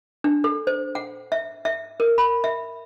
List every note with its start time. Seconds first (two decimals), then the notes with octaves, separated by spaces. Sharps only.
0.24 D4
0.44 A4
0.67 C5
0.95 F#5
1.32 E5
1.65 E5
2.00 A#4
2.18 B5
2.44 E5